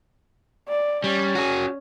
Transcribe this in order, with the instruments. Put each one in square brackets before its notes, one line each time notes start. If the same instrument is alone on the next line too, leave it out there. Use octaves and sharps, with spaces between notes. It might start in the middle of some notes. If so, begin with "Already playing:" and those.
[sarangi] D5
[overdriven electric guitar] G3 [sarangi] C#4
[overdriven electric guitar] F#4 G#4